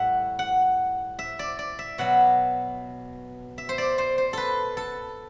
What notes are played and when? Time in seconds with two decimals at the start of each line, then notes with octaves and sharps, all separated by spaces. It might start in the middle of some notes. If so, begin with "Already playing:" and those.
Already playing: A2 G3 E5 F#5
0.39 F#5
1.19 E5
1.39 D5
1.59 D5
1.79 E5
1.98 B2 F#3 F#5
3.58 E5
3.69 C5
3.78 D5
3.98 C5
4.18 C5
4.33 A4 B4
4.77 A4